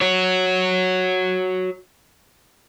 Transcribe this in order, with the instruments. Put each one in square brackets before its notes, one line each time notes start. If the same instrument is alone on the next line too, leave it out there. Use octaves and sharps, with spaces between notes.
[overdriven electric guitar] F#4 C#5